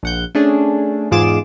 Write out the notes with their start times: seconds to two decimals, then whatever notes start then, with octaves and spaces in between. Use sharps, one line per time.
0.03 A#1 F#5 G6
0.35 A3 C#4 D4 G#4
1.11 E2 G#2 F4 G#4 D6 E7